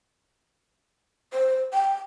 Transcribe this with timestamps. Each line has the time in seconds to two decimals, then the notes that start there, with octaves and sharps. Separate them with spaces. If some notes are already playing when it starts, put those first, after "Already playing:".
1.33 C5
1.73 G5